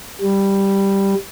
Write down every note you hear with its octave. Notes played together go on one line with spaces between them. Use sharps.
G3